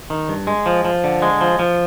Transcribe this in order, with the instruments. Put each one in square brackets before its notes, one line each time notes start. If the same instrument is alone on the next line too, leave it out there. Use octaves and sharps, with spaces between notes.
[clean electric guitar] D#3
G2
G#3
F3
F3
D3
G#3
F3
F3